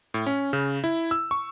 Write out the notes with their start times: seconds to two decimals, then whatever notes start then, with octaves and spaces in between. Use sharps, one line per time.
0.14 A2
0.26 C#4
0.53 C#3
0.84 E4
1.11 E6
1.31 C#6